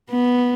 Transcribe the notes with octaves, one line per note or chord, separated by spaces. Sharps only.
B3